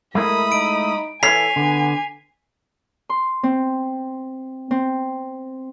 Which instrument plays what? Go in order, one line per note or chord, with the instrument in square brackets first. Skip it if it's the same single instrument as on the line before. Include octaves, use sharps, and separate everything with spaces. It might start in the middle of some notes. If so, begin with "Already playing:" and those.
[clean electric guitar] G#3 A3 E4 [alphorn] A#4 [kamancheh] B5 D#6
[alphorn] D#4 [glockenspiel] D7
[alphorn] E3 [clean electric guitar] A4 C#5 A5 [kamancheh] G#5 [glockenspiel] B6 C7 F7
[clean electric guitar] D3 [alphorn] B3
[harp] C6
C4
C4